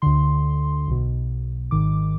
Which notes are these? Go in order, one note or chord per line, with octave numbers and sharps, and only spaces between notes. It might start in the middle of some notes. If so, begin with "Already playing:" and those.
D2 D3 C6
B1 B2
G#1 G#2 D#3 D6